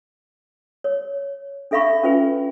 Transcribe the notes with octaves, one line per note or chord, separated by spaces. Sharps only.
C#5
D4 A4 E5 F5 B5 C#6
C#4 F4 B4 G#5